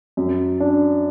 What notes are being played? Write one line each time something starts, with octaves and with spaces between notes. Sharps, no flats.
F#2
D4